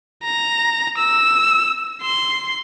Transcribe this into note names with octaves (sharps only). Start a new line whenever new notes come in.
A#5
E6
C6